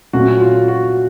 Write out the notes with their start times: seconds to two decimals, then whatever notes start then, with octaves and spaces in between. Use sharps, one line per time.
0.13 A#2 F#3 A3 C#4 F#4
0.41 F4
0.68 F#4